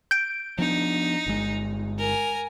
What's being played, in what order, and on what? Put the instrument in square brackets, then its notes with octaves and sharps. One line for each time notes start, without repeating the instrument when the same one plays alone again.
[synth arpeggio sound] G6 D7
[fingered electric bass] F3 B3 D4 [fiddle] D#4
[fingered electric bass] G1 G#3
[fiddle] A#4 G#5